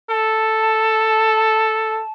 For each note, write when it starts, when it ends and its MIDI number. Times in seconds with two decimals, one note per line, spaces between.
0.11 2.02 69
0.11 2.12 81